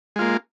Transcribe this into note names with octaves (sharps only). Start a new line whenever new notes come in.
G#3 A#3 F4